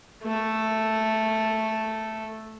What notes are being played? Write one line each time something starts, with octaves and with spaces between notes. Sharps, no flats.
A3 A4